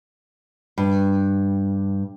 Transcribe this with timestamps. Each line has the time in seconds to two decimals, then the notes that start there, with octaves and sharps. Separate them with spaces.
0.78 G2